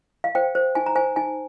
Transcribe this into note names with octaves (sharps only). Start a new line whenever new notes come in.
F5
C5 G5
C5
D#4 G#5
A#5
C5 G#5
D#4 G#5